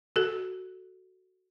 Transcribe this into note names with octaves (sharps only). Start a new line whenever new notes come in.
F#4 A4